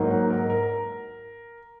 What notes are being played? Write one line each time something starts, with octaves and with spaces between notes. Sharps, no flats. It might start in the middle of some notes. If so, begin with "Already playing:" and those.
Already playing: G#2 F#3 A#3 D#4
F#5
A#4
A#4